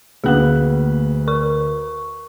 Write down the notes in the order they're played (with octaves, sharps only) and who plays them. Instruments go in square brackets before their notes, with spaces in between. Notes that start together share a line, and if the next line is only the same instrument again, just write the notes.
[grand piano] D2 B4 F#6 [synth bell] A3 A#3 G#4
[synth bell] A#4 C#6